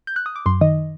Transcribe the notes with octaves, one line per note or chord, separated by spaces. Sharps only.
G6
F#6
D#6
D6
F#2 C6
D#3 D#5